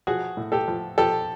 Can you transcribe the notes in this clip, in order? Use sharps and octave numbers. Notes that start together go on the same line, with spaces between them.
F3 F#4 G#4
A2
G4 A4
F3
F3 G4 A4